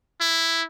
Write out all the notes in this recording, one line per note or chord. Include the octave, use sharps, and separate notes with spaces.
E4